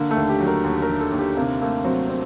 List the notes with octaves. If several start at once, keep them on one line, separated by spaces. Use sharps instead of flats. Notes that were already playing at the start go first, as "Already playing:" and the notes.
Already playing: D3 A#3
A3
D#2
G4
F#3
A#4
D#2
A#4
D3
A4
D#2
G4
C3 A#3
A3 A#3
F#3 C4
C4